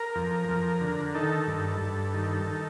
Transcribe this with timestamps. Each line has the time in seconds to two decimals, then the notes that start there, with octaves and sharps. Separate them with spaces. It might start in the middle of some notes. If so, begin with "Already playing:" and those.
Already playing: A#4
0.15 F2
0.49 F2
0.81 D3
1.15 D#3 A4
1.47 G2
1.81 G2
2.14 D#3
2.47 D#3